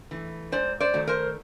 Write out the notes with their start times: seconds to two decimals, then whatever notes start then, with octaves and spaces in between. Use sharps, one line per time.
0.11 E3 A3
0.52 G#2 C5 D5
0.80 C5 D5
0.94 D#3 F#3 A3
1.07 A#4 C5